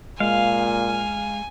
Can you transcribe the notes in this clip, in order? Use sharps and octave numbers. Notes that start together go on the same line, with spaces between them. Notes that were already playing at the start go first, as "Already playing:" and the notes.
A#2 G#3 F5 G#5